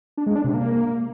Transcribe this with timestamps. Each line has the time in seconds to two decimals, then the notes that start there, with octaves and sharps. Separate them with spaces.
0.18 D4
0.27 G#3
0.36 D4
0.45 C3
0.54 A#3